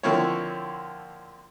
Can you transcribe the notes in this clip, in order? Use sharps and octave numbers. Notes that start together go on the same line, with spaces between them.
D3 F3 A#3 C4 E4 C#5